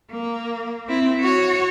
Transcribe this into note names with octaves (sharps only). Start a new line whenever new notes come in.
A#3
C4 E4
F#4 C#5